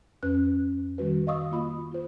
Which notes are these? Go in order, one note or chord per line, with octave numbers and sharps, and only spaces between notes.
F2 C#4 B4 F#6
D#3 G3 F#4 B4
D#5 F5 C#6 D#6 E6
A#3 F4 B5 D#6
F4 C5